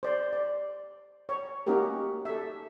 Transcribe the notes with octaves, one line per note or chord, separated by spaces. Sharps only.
C5 D5
D5
C#5
A#3 C#4 D#4 F#4 G4 A#4
A4 E5